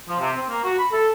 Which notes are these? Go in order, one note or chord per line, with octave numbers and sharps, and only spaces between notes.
F3
C3
C4
A#3
F#4
B5
A4